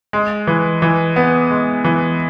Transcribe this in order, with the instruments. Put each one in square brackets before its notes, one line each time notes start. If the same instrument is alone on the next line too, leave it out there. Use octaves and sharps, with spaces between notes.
[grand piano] G#3
E3
E3
B3
G#3
E3